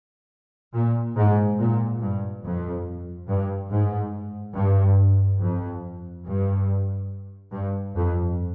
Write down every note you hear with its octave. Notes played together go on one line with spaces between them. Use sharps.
A#2
G#2
A#2
G2
F2
G2
G#2
G2
F2
G2
G2
F2